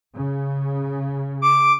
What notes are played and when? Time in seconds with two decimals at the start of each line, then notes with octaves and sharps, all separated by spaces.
0.15 C#3
1.42 D6